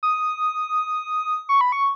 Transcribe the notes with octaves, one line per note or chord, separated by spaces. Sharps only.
D#6
C#6
B5
C#6